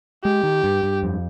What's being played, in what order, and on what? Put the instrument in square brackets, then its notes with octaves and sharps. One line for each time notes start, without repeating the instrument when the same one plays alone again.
[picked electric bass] G#3 [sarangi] G4
[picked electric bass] D#3
G2
G2
F2